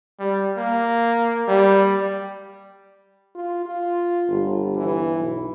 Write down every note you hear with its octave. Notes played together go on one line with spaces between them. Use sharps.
G3
A#3
G3
F4
F4
G1
E3
B1